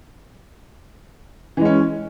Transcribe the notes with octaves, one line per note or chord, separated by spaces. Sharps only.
E3 G#3 C#4